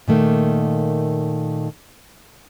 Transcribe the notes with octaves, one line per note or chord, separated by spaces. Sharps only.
A#2 D#3 A3 A#3